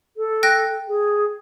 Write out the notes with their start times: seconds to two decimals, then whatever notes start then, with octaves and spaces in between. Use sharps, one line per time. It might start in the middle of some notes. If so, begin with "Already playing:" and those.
0.17 A4
0.43 G5 F#6 A#6
0.88 G#4